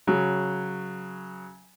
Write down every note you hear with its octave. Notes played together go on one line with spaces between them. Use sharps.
C#3 F#3